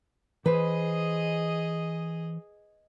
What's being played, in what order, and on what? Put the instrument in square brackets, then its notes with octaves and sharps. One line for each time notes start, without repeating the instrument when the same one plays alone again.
[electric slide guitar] E3 C5 [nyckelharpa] G#4 D#5 [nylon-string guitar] B4